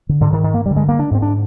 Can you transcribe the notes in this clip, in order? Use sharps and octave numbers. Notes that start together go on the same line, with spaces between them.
D3
G#2 D3
D#3
D#3
A#3
G2 D3 G3
G#3
A#3
D4
G#2 C4
D4